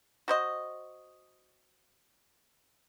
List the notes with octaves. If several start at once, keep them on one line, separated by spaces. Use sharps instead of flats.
F#4 C5 D#5